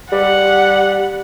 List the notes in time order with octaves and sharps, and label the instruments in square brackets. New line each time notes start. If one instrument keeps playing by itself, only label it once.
[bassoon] G3 [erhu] F#5